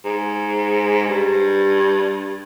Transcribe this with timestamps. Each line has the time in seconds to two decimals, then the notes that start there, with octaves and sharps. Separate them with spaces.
0.05 G#2
1.09 G2